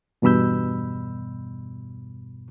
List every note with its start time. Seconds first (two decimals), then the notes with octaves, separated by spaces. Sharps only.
0.22 E2 G2 B2 B5 E6 G6